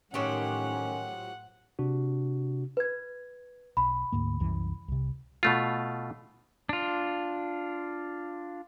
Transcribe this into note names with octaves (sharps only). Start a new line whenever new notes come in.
A2 D#3 F3 F#3 C#4 G4 F#5
C3 D4 F#4
B4 G#6
B1 B5
D2 G#2 A#3
C2 F#2 E3
C2 C3
B2 A3 F4
D4 F4